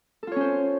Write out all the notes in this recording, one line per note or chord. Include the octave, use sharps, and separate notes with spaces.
C#4 F4 A4 C5 C#5